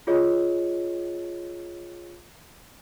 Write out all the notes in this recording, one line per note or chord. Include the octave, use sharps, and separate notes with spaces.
F4 G#4 C#5 D#5